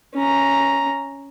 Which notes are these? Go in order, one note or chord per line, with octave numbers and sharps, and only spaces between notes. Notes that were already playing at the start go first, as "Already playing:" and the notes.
C#4 A#5